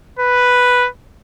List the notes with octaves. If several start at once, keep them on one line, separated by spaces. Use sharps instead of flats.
B4